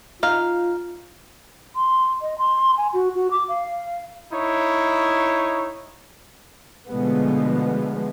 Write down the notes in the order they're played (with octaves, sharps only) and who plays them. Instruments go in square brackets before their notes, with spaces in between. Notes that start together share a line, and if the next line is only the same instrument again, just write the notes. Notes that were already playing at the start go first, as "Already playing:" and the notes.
[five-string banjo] D#4 F5 [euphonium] F4
[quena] C6
D#5
C6
G#5
F#4
F#4
D6
F5
[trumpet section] D#4 E4 C#5
[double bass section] B2 D3 F3 G#3 A3 B3